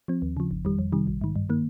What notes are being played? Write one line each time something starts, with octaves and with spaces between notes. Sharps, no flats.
F3 C4
D#2
C#3 F3
G1
F2 D#3 G3
F2
C3 D#3 G3
A#1
G#2 D#3
G2
D#3 A#3